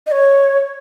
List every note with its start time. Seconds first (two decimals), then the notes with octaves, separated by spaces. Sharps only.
0.07 D#5
0.11 C#5